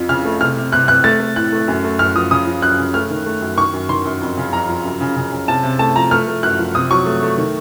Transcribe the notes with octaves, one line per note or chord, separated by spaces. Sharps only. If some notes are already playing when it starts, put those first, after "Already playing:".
Already playing: F2 F3
C#3 F6
A3
C3 F6
C3
C3 F#6
C3 F#6
A3 A6
A3
A2 F#6
A3
F#2
A3
F#2 F6
F3 D#6
C#3 D#6
F3
F#2 F#6
C#3
A3 F6
D#3
A3
F#2
D#3 C#6
F#2
D#3 C6
F#2
F2
C#3
F2 A#5
F3
F#2
C#3
C#3
C#3
C3 A5
C3
A3 A5
F3 A#5
A3 F6
A3
F#2 F#6
F3
C3 D#6
F#3 C#6
A3
A3
D#3